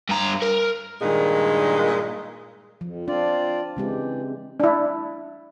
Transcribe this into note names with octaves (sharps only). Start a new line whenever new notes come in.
G2 A#5
A#4
G2 A#2 D#3 G#3
F2 F3
C4 D4 F4 D5
C#3 E3 G#3 C4 G4
D4 E4